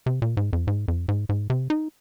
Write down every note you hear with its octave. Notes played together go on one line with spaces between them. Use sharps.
C3
A#2
G#2
F2
G#2
F2
G#2
G#2
C3
D#4